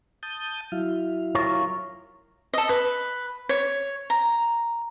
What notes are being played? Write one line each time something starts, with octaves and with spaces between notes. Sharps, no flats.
A5 D#6 G6
F#3 E4 F5
F4 A#4 C#5
A4 D#5
B4
C#5
A#5